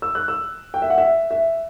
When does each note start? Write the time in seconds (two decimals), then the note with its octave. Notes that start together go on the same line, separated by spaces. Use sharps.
0.02 E6
0.15 F#6
0.28 E6
0.74 G5
0.82 E5
0.90 F#5
0.98 E5
1.31 E5